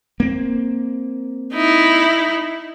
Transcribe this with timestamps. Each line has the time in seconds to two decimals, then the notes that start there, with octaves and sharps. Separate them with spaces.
0.20 A#3 C4
1.53 D#4 E4